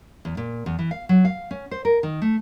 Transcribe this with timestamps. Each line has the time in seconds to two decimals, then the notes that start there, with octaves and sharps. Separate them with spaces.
0.25 E2
0.37 A#2
0.66 E2
0.79 E3
0.91 F5
1.09 F#3
1.25 F5
1.51 C#4
1.71 C5
1.85 A#4
2.03 D#3
2.22 A3